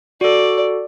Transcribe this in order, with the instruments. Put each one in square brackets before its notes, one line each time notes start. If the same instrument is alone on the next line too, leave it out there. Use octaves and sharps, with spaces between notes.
[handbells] F#4 A4 [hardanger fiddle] D5